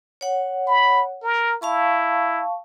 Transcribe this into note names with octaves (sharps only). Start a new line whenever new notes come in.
C#5 F#5
B5
A#4
E4 F5 A5 C#6